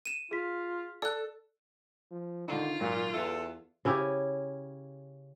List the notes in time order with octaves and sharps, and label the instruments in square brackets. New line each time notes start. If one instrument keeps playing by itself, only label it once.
[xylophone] D#7 E7
[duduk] F4 [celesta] G#4 B6
[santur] A4 [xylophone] D5 F#6
[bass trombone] F3
[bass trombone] D3 [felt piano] D#3 D4 [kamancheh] F4
[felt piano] G#1 F#3 [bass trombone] A#2
[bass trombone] E2 [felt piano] E4 B4 [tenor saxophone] A4
[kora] C#3 C#4 E4 G4